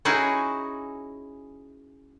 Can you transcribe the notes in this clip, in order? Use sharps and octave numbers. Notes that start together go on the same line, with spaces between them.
C#4 D#4 E4 F#4 G#4